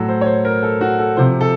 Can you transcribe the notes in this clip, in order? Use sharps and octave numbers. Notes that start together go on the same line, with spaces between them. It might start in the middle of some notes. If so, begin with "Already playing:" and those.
Already playing: A2 F#3 A4
C5
C#5
C5
A#4
A4
F#4
A4
C3 F3 C5
A4